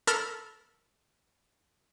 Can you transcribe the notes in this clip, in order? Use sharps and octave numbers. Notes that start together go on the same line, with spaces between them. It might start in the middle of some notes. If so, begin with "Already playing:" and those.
A4 A#4 B5 F6